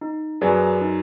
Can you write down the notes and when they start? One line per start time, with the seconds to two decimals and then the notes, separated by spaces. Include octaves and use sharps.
0.01 D#4
0.41 F#2 F#3 G#4 B4 D5
0.81 D#4